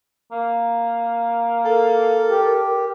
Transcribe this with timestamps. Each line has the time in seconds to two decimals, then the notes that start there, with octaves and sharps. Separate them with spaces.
0.32 A#3
1.65 A4 A#4
2.29 G4